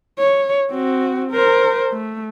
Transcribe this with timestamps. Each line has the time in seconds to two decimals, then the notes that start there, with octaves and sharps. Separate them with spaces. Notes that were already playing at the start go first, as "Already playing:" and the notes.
0.19 C#5
0.71 C4 F#4
1.32 A#4 C5
1.92 A3